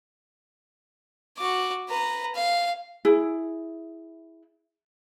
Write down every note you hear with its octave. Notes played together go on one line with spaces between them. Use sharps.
F#4 D6
B4 A#5
F5
E4 G#4